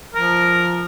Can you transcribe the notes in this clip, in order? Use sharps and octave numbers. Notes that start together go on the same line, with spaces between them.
F3 A#4